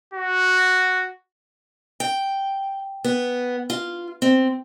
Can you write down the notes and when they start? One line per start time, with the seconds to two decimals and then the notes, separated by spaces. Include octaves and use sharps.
0.14 F#4
2.00 G5
3.04 B3
3.70 F4
4.22 C4